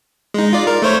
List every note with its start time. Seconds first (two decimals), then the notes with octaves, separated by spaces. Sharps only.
0.34 G#3 D#4
0.53 F4 D5
0.67 A#4
0.82 A3 C5 C#5